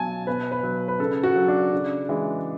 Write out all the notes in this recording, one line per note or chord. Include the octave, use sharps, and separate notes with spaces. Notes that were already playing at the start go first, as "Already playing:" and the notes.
Already playing: B2 F#3 G#5 A5
B2 B4
B4
F#3
B4
C#3 A4
F#4
F#3
D4
C#3
E3 G#3